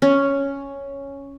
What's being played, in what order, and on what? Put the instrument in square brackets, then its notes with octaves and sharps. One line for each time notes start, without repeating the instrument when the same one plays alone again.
[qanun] C#4